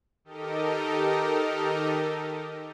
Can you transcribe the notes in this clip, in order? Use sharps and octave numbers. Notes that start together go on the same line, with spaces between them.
D#3 D#4 G4 A4 A#4 D#5